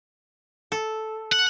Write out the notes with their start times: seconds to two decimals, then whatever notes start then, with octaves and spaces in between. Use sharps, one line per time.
0.72 A4
1.32 F#5